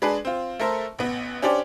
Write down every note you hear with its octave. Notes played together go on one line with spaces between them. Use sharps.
G#3 D4 G#4 B4
C4 F4
A3 A4 A#4 C5 E5
A1 B3
C#4 D4 G4 C5 D5